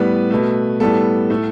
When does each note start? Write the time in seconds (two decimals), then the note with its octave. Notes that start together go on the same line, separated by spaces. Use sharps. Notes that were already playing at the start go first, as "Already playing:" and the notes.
Already playing: A2 G3 B3 B4
0.31 B2 A3
0.80 A2 G3 B3 A4
1.30 A2 A3